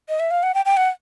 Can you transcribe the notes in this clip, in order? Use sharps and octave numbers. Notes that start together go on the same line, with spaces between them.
D#5
E5
F5
F#5
G5
G5
F#5